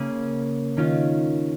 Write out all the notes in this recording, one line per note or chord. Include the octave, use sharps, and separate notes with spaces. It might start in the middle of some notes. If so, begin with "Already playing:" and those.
Already playing: C#3 A#3 C#4 G#4
D#3 C#4 F4